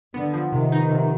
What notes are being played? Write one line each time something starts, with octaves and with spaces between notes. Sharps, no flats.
D3 B3
F3
C3 D#3
D#4
C3